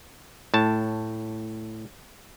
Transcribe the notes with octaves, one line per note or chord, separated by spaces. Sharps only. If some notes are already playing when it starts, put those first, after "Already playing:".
A2 A5